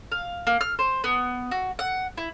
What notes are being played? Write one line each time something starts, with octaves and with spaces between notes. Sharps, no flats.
F5
A#3
F6
C5
B3
F#4
F#5
E4